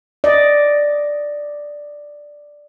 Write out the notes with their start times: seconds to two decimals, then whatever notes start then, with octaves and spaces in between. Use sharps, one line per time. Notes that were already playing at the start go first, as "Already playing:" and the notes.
0.24 D5 D#5